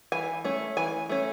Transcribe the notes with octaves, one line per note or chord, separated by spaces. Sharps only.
E3 G#5
A3 C#4
E3 G#5
A3 C#4